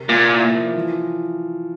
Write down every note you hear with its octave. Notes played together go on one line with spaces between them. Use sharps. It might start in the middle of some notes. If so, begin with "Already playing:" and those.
Already playing: C3 A#4
A#2 A#3
E4
F3
E3